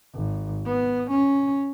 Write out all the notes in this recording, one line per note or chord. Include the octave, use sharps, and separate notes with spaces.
G#1
B3
C#4